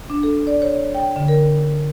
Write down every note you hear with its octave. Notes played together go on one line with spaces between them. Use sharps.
D4
A4
D5
C#5
G5
D3
A#4